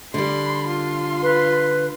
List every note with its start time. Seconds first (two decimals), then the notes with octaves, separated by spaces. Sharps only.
0.14 D3 G3 B5 C6
0.68 F4 C6
1.23 B4